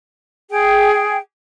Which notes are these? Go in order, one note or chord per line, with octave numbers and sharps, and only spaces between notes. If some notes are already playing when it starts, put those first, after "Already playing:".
G#4 G5